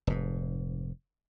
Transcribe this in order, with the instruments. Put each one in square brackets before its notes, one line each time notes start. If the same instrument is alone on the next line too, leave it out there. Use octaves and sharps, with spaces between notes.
[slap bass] F1 G#2